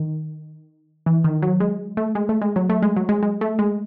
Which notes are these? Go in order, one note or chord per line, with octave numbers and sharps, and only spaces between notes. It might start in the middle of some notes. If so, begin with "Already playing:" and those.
Already playing: D#3
E3
D#3
F#3
G#3
A3
G#3
A3
G#3
F#3
A3
G#3
F#3
G#3
G#3
A3
G#3